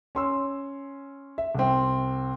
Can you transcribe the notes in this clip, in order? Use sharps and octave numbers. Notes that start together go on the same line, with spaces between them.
C#4 C6 E6
E5
C2 C4